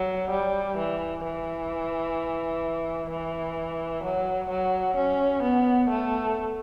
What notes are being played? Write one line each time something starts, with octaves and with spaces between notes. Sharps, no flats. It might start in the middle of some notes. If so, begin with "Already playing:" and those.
Already playing: F#3
G3
E3
E3
E3
F#3
F#3
C#4
B3
A3